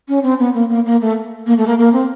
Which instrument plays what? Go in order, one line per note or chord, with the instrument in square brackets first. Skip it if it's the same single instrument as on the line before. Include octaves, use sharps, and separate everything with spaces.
[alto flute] C#4
C4
B3
A#3
A#3
A#3
A3
A#3
A3
A#3
A#3
C4